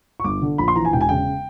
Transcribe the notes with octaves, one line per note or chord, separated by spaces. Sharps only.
C#6
G1 D6
D3
A#1 B5
C6
E3 A#5
G#5
E1 G5
G#5
C#3 G5